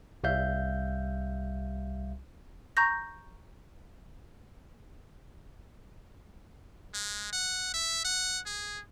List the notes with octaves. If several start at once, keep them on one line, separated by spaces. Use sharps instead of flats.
C2 G3 E5 F5 G6
A#5 C#6 G6 A#6
G#3
F#5
E5
F#5
G#4